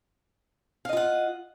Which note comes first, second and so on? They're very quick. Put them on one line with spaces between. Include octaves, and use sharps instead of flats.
F5 D#5 F4 F#5